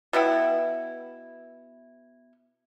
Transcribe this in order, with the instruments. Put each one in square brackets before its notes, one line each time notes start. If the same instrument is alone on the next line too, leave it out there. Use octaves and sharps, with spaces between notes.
[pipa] B2 B3 E4 G5